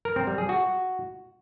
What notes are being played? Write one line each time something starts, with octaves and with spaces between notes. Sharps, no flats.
A#4
C4
G3
G#4
F#4